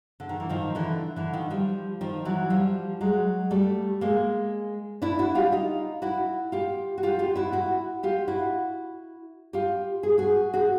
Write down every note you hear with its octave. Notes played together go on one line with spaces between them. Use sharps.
D3
D#3
E3
D#3 F3
D3 E3
D3 E3
D#3 F3
F3 G3
D#3 F3
E3 F#3
F3 G3
F#3 G#3
G3 A3
G#3 A#3
D4 E4
E4 F#4
F4 G4
D#4 F4
E4 F#4
F4 G4
F#4
F4 G4
F4 G4
E4 F#4
E4 F#4
F4 G4
E4 F#4
F4 G4
G#4
F#4 G#4
F#4 G#4